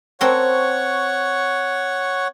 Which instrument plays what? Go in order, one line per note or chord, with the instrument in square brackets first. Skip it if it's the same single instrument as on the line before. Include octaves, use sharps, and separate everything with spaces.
[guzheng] C4 A4 A#4 [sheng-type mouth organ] C#5 F#5 C#6